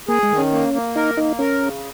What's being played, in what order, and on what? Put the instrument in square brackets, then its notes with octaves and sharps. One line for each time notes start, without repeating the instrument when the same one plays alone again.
[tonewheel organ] A#3 [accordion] G#4
[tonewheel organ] G#3
[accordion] D#3
[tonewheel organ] C#4
[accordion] A#3
A#3
[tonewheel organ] D#4 [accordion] A#4
[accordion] A#3 [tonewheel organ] D#4
[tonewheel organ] C#4 [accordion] A#4
[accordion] C#3